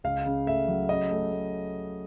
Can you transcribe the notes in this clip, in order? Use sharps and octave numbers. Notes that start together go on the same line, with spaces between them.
C#2 F5
C#3
A3 E5
F#3
C#3 D#5
A3
A3